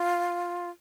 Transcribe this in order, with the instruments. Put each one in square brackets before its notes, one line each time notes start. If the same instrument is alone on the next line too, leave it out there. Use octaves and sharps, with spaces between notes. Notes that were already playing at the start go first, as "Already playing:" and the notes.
Already playing: [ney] F4